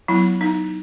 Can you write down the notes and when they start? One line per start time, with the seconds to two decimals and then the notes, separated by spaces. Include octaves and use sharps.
0.08 F#3 B3 E4
0.41 D#4